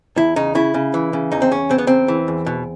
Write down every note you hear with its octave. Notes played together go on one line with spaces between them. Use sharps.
E2 E4
C#3 D#4
C#3 E4
C#3
E3
C#3
E2 D#4
C4
E2 C#4
C#3 C4
B3
E2 C4
E3
E2
B2